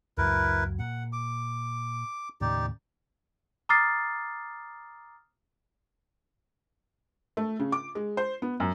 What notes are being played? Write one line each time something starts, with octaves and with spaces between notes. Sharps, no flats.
C#2 F#2 F#3 E4 A#4 B4
A#2 F#5
D6
D#2 A2 C#3 D#4 G4 D5
A#5 D6 D#6 F6 A6 C7
A3
C#3
D6
G#3
C5
B3
F#2